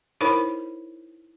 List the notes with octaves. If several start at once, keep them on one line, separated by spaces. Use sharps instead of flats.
D#4 E4 A#4 C5 C#5 B5